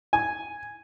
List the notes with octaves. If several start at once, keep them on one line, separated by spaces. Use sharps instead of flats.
G#5